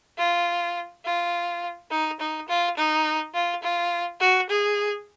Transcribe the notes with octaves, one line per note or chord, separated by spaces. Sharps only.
F4
F4
D#4
D#4
F4
D#4
F4
F4
F#4
G#4